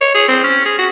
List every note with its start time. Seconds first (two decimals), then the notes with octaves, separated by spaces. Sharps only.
0.01 C#5
0.15 G#4
0.28 C4
0.44 C#4
0.65 G#4
0.78 F#4